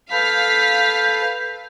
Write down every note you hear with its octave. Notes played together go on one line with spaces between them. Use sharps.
A4 B4 F5 G6 B6